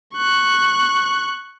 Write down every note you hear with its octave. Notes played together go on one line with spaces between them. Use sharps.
C#6 F#6